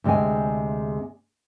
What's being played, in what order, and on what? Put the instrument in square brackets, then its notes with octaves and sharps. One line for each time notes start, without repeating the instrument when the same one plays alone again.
[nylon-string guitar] D2 C3 G#3 G#4 G#5